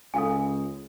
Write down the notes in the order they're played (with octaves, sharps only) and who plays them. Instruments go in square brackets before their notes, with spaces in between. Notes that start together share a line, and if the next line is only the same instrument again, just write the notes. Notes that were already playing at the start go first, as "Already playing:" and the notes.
[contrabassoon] C#2 [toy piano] A4 F5 G#5